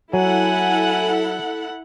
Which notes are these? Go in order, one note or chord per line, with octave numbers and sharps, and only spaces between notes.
F#3 E4 A4 F#5 G#5